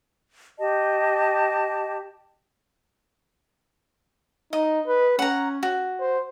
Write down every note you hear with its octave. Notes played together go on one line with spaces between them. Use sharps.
G4 D#5 A5
D#4 D#5
B4
C#4 F#5 A#5
F#4
C5